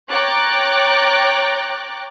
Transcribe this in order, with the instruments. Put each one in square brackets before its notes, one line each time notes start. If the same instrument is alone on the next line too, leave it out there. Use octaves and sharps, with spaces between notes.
[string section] C#5 G5 A#5 D6 F#6 A6